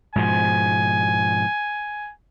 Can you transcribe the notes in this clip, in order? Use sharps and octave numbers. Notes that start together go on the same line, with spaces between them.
G#2 B2 F3 G#5